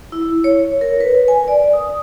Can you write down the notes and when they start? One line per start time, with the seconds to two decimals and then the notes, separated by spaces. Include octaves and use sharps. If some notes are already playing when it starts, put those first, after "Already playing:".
0.12 E4
0.44 C#5
0.81 A#4
1.00 B4
1.28 G#5
1.48 D5
1.73 D#6